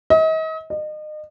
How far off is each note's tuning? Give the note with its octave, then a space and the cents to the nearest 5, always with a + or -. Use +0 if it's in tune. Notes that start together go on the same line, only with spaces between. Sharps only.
D#5 +40
D#5 -35